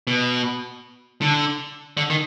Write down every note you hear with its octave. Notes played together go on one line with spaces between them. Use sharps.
B2
D3
D3
D#3